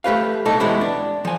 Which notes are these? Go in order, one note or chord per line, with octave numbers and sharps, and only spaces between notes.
A3 G4 B4 F5
B2 G3 D#4 A4
E2 B2 G#3 B3 E4 G4
D4
F3 G#5